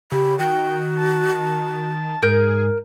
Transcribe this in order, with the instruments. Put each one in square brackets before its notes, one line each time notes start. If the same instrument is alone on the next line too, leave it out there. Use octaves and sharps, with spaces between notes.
[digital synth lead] C#3 [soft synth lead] G4 [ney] B5
[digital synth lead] D#3 [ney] F#4 [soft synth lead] G5
[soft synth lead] A5
[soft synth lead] G#2 [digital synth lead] G#4 [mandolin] A#4 G6